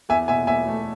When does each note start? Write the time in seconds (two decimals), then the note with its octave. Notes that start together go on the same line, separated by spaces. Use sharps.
0.09 E2 E5 G#5
0.28 B2 E5 G#5
0.47 E2 E5 G#5
0.68 A3